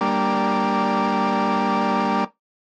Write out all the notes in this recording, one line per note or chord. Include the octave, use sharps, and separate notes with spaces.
G3 A#3 D4